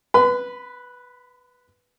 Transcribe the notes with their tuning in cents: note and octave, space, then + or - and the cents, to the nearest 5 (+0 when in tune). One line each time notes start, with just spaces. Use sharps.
B4 -5 B5 +45